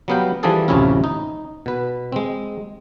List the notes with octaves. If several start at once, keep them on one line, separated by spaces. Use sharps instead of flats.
F#3 G3 B3 F5 G5
E3 F3 G3 D4 G#4 A4
A1 D2 C3 C#4 E4 F4
D#4
B2 B4
G#3 C4